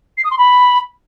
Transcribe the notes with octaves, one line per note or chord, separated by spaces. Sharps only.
C7
D#6
C6
B5